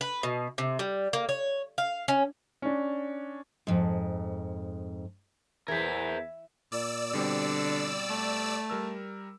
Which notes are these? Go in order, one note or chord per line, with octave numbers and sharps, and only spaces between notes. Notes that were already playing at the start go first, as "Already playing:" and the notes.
B4
B2
C3
G3
A#3
C#5
F5
C#4
C#4 D4
F2 G#2
E2 E3 A#4 C5 G#6 B6
A#2 D5 E6
B2 D3 G3 C4
A3
G3 A#4 E6